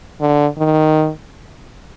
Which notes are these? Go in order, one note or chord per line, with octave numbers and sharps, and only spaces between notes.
D3
D#3